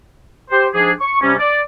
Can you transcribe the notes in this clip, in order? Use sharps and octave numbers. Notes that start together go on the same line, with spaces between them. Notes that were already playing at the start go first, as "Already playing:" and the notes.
G4 C5
G#2 F3 D4 G4 G#4
C#6
C3 G3 C#4
D5